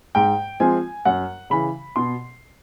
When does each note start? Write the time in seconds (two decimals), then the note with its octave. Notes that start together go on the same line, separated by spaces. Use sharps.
0.15 G#2 G5
0.60 F3 G#3 C4 G#5
1.05 F#2 F#5
1.50 C#3 E3 B5
1.96 B2 C6